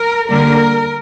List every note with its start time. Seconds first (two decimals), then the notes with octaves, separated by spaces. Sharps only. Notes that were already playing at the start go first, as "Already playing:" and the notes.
Already playing: A#4
0.29 D3 G3 A#3 A#4